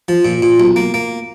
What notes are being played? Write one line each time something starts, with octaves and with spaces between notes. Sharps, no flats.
F3
A#2
A#2
B1
A#3
A#3